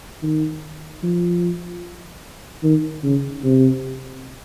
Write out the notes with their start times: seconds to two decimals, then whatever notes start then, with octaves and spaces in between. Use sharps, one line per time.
0.23 D#3
1.03 F3
2.64 D#3
3.04 C#3
3.44 C3